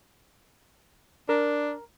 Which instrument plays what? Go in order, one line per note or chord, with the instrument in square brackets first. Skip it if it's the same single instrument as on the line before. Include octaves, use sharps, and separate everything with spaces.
[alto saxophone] D4 [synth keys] A#4